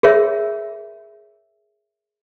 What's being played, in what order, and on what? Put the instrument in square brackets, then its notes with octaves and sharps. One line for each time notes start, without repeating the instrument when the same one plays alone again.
[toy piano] G#4 A#4 C#5 E5